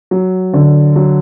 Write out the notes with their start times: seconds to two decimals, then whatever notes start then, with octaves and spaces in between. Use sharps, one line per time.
0.11 F#3
0.53 D3
0.96 F#3